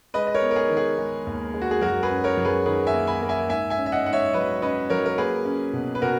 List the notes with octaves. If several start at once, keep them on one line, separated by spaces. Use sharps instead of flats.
G#3 B4 D#5
D#5
A#4 C#5
B3
A#4
G#4
D#3
G#4
G#3
D#2
G#3
F#4
G#4
F#2 F#4 A#4
G#4 B4
C#4
A#4 C#5
F#2
G#4 B4
D#3 G#4 B4
E5 G#5
A#3
G#5 B5
A#3
E5 G#5
G#2 E5 G#5
E5 G#5
C#4
E5
D#5 F#5
G#2 F#5
C#5 E5
F#3 B4 D#5
C#4 B4 D#5
F#3 A#4 C#5
A#4
A#3 G#4 B4
C#4
B2
B4
B2 F#4 A#4